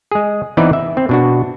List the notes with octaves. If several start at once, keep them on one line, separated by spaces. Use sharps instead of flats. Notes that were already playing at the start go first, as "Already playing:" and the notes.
G#3 G#4
E3 B3 C4 D#4 B4 D5
E5
C4
B2 D4 F#4